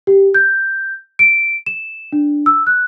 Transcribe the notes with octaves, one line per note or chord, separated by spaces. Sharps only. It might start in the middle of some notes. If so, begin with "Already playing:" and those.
G4
G6
D7
E7
D4
E6
F#6